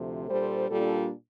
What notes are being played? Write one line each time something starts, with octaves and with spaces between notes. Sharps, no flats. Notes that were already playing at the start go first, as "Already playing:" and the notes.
Already playing: D2 C3 F3 A3
A#2 G3 D4 A4 C5
A#2 G3 A#3 D4 F4 A4